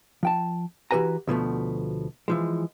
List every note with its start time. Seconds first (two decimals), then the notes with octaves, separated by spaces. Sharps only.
0.23 F3 G5 A5
0.91 E3 F#4 G4 B4 G#5 A#5
1.27 D2 B2 F3 A3
2.28 E3 F3 G#3